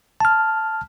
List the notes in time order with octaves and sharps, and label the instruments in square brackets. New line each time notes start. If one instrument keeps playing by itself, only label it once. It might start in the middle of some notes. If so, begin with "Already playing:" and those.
[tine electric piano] A5 F6